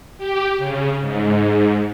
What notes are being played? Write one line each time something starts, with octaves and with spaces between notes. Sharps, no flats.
G4
C#3
G#2